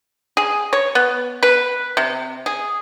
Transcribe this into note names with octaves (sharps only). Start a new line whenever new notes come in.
G#4
C#5
B3
B4
C3
G#4